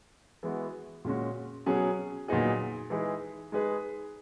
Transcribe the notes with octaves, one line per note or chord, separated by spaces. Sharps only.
E3 G#3 B3 F#4
A#2 G#3 C#4 F#4
B2 F#3 C#4 G#4
A#2 F#3 B3 D#4 G#4
E3 G#3 D#4 G#4 B4
G#3 D#4 G#4 B4